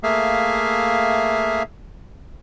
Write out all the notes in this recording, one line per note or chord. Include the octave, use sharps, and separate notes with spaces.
A3 A#3 G#4 E5 F5